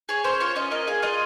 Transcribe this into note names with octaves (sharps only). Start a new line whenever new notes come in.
G#4 C#5
C#4 C5
F4 C#5
C#4 D#5
A#3 D#5
G#4 F5
F4 D#5